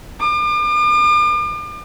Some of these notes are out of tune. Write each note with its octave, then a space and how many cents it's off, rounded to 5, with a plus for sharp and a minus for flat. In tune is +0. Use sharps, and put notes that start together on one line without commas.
D6 +40